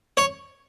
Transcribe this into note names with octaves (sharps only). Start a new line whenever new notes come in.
C#5